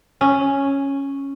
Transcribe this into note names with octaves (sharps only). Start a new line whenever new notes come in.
C#4